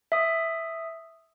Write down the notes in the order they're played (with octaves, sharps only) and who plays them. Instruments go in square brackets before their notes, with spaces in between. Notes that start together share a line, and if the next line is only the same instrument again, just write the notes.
[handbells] E5 D#6